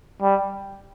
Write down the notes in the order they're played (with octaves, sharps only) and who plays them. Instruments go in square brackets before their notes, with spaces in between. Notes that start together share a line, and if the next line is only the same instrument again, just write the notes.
[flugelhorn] G3